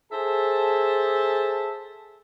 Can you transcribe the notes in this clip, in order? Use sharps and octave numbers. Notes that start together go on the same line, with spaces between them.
G#4 A4 C5 E5 A5